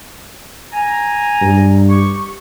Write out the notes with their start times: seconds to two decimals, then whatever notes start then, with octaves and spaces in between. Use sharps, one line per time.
0.73 G#5 A#5
1.42 G2
1.90 G4 C#6